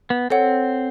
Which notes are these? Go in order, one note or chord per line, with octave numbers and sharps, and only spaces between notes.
B3
C4 A4 C#5 F#5